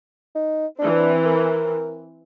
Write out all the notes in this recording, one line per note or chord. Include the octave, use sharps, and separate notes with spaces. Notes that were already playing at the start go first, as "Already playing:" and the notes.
D#4
E3 C4 D4
A#4